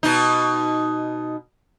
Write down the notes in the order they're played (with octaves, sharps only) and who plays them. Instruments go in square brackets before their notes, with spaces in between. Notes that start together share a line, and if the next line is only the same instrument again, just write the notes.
[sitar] B2 D#4